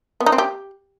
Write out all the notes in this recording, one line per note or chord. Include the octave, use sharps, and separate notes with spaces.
B3
D#4
C4
G4